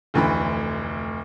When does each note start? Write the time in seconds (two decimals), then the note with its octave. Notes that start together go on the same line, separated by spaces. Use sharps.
0.14 F1 D2 E3 B5